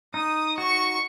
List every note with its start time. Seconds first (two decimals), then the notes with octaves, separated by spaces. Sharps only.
0.14 D#4 D#6
0.58 F#4 C#6